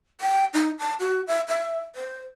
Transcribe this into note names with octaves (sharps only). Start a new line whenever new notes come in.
G5
D#4
A5
F#4
E5
E5
C5